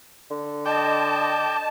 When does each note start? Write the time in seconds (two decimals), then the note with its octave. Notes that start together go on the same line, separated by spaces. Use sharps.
0.31 D3
0.66 D#5 G5 A5 D6